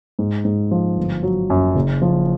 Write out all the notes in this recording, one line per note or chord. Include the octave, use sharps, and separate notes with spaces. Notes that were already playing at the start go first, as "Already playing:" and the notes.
G#2
G#2
F3
G1
F#3
F#2
F#1
F3